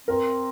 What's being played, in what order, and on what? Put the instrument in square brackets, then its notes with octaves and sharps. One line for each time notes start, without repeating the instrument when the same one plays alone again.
[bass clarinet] C4 [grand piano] A#4